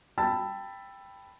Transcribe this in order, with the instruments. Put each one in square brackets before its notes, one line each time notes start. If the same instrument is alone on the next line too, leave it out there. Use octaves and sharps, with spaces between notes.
[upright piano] G5 A5 B5 E6 A6